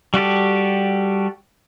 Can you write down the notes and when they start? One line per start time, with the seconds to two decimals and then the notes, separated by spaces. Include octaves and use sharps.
0.14 G3 F#4 G4 A4